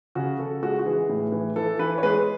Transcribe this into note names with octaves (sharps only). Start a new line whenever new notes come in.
C#3 F#4
C#3 A4
G#3 F#4
F#4
E3 G#4
A2
E3
E3 A4
E3 B4
C#5
G#3 B4